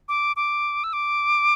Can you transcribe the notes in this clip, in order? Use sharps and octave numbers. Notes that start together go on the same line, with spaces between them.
D6
D6
E6
D6